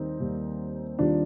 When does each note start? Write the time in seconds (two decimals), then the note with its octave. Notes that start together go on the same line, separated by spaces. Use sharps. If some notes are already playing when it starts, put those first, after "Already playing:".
Already playing: D#2 D#3 G3 A#3 C4 D#4
0.19 D#2 D#3 G3 A#3
0.98 D#2 D#3 G3 A#3 D4 F4